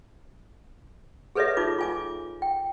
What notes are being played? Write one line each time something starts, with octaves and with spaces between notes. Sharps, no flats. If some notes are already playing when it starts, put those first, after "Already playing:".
G#4 A4 B4 C#5 D#5 E5
D#4 F4 D6
F4 G#5 D6
G5